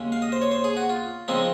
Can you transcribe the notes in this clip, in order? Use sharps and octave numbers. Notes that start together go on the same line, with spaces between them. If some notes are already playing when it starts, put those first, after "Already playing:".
Already playing: D#2 C#3 G#3
F5
D#5
C5
C#5
C5
G#4
F#4
F4
C#3 F3 G#3 C4 D#4